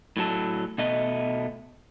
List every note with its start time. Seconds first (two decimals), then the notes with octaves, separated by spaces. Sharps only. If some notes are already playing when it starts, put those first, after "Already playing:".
0.17 A2 F#3 A4
0.78 B2 A3 D#5